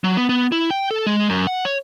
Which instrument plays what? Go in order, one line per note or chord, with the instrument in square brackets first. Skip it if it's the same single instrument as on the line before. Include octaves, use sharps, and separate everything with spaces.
[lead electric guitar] F#3
B3
B3
E4
G5
A4
G#3
F#2
F#5
C#5